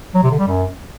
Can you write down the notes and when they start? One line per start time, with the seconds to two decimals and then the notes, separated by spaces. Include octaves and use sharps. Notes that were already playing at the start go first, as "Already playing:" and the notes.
0.15 F#3
0.23 C3
0.31 D3
0.39 G3
0.47 F#2